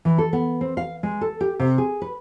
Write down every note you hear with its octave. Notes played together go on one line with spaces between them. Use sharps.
E3
A4
B3
C4
F5
G#3
A4
G4
C3
G#4
B4